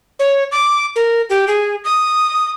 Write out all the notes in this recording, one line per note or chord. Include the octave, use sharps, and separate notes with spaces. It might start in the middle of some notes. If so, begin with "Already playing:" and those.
C#5
D6
A#4
G4
G#4
D#6